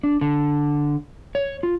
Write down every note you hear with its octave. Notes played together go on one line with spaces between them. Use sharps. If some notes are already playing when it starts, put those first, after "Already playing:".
D4
D3
C#5
F4